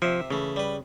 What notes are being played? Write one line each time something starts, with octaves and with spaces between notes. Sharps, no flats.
C3 F3 E5
C#3 E3 A3
G3 B4